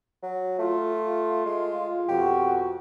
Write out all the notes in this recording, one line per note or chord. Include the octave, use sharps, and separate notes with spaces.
F#3
A3 F4
G#3
F2 B2 F#4 G4